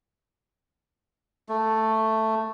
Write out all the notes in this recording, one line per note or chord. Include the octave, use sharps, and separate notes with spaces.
A3